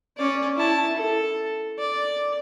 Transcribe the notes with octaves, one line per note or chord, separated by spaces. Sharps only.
C#4 D5
E4 A5
A4
D5